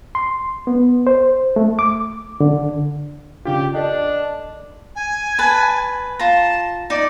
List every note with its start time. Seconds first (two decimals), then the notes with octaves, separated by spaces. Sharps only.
0.15 C6
0.67 B3
1.07 C5
1.56 A3
1.79 D6
2.41 D3
3.45 C#3 D4 F4 G4
3.75 D4 A4 D#5
4.96 G#5
5.38 B4 A5
6.19 F4 A5 A#5
6.90 D#4 D5